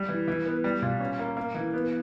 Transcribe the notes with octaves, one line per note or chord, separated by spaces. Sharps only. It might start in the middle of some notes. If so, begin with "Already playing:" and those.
Already playing: G3
E3
E3
B3
G3
A#2
C#4
A#3
A#3
E3
B3